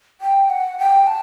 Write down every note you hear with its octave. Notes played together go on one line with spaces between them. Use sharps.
G5
F#5
G5
A5